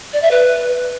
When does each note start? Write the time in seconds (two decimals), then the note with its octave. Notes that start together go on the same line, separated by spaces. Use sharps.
0.13 D5
0.22 E5
0.31 B4